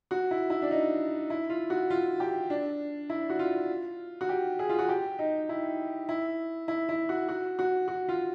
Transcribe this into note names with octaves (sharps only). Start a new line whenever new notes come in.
F#4
E4
E4
D4
D#4
E4
F4
F#4
F4
G4
D4
E4
F#4
F4
F#4
G4
G#4
F4
F#4
G4
D#4
E4
E4
E4
E4
F#4
F#4
F#4
F#4
F4